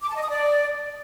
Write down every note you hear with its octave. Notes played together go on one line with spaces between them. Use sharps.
D6
A5
D#5
D#6
D5